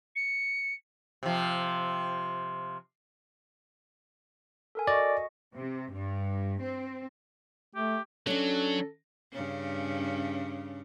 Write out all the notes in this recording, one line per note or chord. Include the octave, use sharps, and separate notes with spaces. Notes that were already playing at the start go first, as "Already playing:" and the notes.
C#7
C3 F3
A4 A#4 G#5
F#4 D5 D#5 C#6
C3
G2
C4
A3 G4
F#3 C#4 D4 A4
G2 C#3 C#4